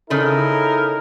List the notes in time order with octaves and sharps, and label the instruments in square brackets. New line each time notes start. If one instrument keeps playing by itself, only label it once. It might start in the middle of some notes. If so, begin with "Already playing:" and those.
[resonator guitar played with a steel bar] C#3 A4 [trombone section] D#4 E4 A#4